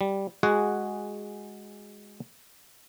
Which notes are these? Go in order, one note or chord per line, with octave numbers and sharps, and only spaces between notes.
G3
G#3 F#4 G#4 F#5